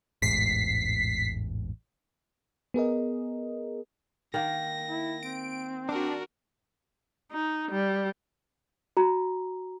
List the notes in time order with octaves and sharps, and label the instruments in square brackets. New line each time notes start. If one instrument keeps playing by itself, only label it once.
[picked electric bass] E1 A1 G#2 [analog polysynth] B6 C7
[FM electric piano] B3 G#4 A#4 D#5
[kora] D#3 A#3 [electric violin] A#6
[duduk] E4
[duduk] C4 [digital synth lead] D7
[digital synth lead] D4 [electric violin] F#4 A#4
[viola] D#4
G3
[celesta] F#4 A#5